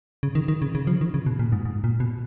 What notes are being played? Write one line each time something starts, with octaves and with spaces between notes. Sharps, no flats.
C#3
D#3
D#3
C#3
C#3
F3
D#3
C#3
B2
A#2
G#2
G#2
A#2
B2